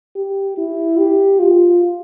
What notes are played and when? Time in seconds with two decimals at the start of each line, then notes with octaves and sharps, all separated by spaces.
0.16 G4
0.57 E4
0.98 G4
1.39 F4